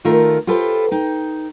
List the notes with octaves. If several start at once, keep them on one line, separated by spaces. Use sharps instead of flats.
D#3 A3 F4 A4 A#4
F4 G4 A4 B4 C5
D#4 G5